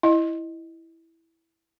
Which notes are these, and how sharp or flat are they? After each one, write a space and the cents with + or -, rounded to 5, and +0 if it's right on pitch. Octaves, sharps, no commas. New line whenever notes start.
E4 +0 D#5 +0